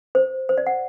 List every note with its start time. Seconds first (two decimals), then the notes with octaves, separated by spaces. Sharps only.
0.15 C5
0.49 C5
0.58 D5
0.67 F#5